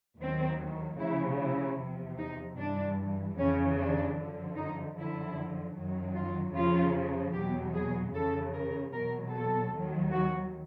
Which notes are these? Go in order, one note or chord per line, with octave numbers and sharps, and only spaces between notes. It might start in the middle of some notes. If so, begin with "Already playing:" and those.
D#2 D#3 F#3 C4
D2 C#3 F3 E4
E4
E2 C3 F3
D#4
G2 E3 D4
F2 C#3 E3 C#4
D4
F#2 D3 F3
D#4
F#2 D3 F3 E4
F#2 D#3 F#3
F4
F2 C#3 F3 F4
E2 B2 F#3 G4
G#4
F2 C#3 E3 A4
A#4
E2 B2 F#3 A#4
A4
D#2 D#3 F#3
F#4